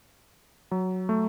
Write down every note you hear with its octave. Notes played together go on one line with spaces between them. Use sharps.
F#3
A3